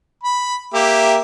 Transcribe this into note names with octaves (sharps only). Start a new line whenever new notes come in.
B5
A#3 G4 E5